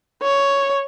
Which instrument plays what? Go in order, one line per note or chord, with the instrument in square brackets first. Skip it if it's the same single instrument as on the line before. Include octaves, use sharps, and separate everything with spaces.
[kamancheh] C#5